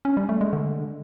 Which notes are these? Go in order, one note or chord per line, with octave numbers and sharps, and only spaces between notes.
C#4
G3
A3
G#3
D3